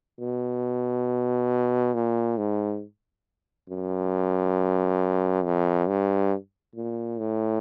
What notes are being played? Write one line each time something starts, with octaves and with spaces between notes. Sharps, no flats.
B2
A#2
G#2
F#2
F2
G2
A#2
A2